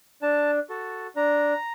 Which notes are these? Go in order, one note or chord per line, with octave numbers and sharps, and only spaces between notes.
D4 A5
F#4 A4
D4 A#5